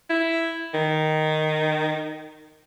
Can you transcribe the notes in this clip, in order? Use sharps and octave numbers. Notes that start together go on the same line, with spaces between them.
E4
D#3